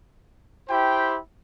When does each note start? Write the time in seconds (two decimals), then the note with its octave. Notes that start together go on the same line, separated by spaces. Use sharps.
0.69 E4 G4 C5 G5